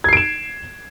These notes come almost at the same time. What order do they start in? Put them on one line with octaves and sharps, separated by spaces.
G#6 C7 D7 E7